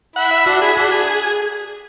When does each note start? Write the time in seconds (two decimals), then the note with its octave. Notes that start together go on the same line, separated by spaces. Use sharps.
0.16 E4 F#5
0.31 E5
0.46 D4 F#4
0.61 E4 G#4
0.77 D4 F#4
0.92 G#4